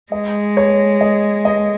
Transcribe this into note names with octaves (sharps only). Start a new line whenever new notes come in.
G#3 D#5
C#5
D#5
D#5